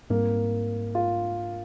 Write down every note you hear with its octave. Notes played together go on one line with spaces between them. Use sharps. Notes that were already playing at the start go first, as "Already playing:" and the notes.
G#2 G3 A#3 C4
F4